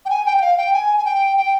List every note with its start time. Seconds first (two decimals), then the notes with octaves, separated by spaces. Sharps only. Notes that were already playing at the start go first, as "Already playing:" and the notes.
0.05 G5
0.10 G#5
0.26 G5
0.37 G5
0.41 F5
0.57 G5
0.73 G#5
0.97 G#5
1.05 G5
1.37 G5